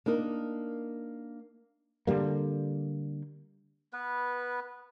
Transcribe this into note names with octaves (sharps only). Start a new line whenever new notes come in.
A#3 D4 D#4 A#4
D3 E3 G3 A#3
B3 B4